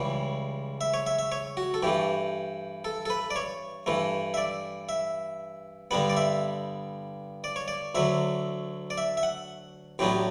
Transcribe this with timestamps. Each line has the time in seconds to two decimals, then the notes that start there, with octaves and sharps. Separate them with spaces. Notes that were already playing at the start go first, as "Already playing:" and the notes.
Already playing: C#2 C#3 E3 G3
0.81 E5
0.94 C#5
1.07 E5
1.19 E5
1.32 C#5
1.57 F#4
1.74 A4
1.83 G2 E3 A3 G4
2.85 A4
3.06 A4
3.10 B4
3.31 D5
3.36 C#5
3.86 G2 E3 A3
4.34 E5
4.37 D5
4.89 E5
5.91 G2 D3 G3 B3 F#5
6.10 D5
6.17 E5
7.44 D5
7.56 C#5
7.68 D5
7.95 D2 D3 F#3 E5
8.90 D5
8.98 E5
9.17 E5
9.23 F#5
9.99 A1 A2 F#3 B3 D4 G4